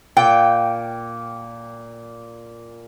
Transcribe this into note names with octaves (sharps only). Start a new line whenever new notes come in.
A#2 G5